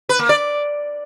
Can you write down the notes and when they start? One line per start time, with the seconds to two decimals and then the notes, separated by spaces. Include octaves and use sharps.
0.09 B4
0.19 A#3
0.29 D5